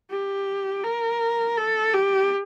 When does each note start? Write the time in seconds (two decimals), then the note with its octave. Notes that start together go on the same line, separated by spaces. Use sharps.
0.11 G4
0.84 A#4
1.57 A4
1.93 G4